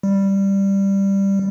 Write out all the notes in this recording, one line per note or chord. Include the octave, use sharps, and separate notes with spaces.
G3